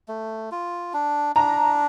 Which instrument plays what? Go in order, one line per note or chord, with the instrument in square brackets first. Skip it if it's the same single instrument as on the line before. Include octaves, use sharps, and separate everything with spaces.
[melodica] A3
F4
D4
[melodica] D4 [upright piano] A#5